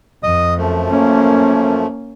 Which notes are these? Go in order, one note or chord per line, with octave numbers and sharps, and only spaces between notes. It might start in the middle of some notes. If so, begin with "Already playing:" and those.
F2 D#5 D#6
F#2 F3 A3
A#3 C#4